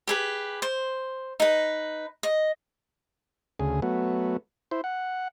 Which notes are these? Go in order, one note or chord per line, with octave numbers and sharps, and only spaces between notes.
G4 G#4 B4
C5
D#4 B4
D#5
D2 C#3 G#4
F#3 A3 B3
E4 C5
F#5